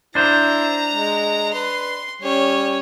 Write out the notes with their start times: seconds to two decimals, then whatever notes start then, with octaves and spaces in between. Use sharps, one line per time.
0.15 D4 E4 C5 A#5
0.93 G#3
1.54 B4 C6
2.22 G3 C#4 C#5